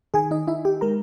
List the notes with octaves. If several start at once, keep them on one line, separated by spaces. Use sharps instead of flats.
D#3 G#4 G#5
D#4 D#5
D#4 E4 E5
G4 G5
G#3 A#4 A#5